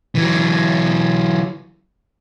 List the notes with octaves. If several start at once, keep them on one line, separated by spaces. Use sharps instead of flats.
E3 F#3